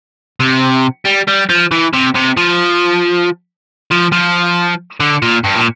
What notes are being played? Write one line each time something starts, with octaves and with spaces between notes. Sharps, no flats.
C3
G3
G3
F3
E3
C3
C3
F3
F3
F3
D3
A#2
G2
A#2